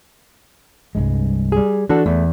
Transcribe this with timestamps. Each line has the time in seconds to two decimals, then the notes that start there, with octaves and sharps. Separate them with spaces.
0.95 C2 G2 G#3
1.52 G3 G#4
1.89 E3 D4 F#4 A4
2.06 E2 A3